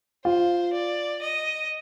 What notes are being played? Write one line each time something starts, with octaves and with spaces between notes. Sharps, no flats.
F4 C5
D5
D#5